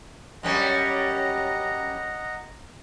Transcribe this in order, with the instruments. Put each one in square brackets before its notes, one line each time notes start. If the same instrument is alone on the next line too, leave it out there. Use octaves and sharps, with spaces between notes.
[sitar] F#2 G3 C#4 [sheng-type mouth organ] D#5 F#5 A#5